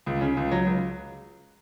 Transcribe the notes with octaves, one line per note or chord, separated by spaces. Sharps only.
C#2
C#3
C#2
F#3
C#2